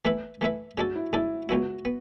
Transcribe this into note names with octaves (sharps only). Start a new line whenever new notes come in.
E3 A3 E4 B4 E5
E3 A3 E4 B4 E5
C#3 G#3 D4 F#4 A4
E4
C#3 G#3 D4 E4 A4
C#2 C#3 G#3 B3 E4 F#4
B3